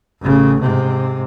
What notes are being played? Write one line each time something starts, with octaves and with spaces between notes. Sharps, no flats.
A1 C#3
G#2 C3